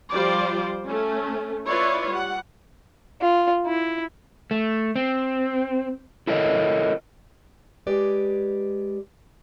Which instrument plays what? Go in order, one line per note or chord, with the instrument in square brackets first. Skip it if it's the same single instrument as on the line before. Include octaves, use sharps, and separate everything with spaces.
[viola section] F3 G3 F4 C5 D5
A3 C#4
E4 F4 B4 C#5 D5
G3 F#5
[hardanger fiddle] F4
E4
[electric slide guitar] A3
C4
E4 A4 A#4 C#5 D#5
[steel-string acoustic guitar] G#3 G4 B4 D5